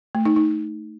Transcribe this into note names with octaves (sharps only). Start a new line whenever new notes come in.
A3
D#4
D#4